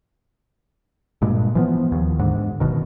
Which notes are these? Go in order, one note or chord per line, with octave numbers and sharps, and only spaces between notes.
G2 A#2 G#3
E3 F3 B3
D#2
G#2 D3
F#1 B2 D#3